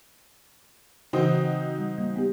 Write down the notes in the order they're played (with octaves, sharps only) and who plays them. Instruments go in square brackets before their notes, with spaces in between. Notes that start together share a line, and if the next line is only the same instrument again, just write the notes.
[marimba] C#3 E3 [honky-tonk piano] C4 D#4 F#4
[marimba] G3
G3 A#3
B3 G4